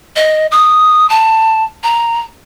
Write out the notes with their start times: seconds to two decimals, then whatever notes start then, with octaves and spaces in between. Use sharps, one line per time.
0.16 D#5
0.51 D#6
1.10 A5
1.83 A#5